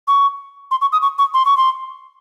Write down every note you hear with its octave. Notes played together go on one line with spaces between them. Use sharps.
C#6
C6
C#6
D#6
C#6
C#6
C6
C#6
C6